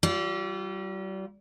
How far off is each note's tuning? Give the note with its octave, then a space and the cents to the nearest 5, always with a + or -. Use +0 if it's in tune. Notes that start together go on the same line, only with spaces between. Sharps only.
G3 -35 F4 +0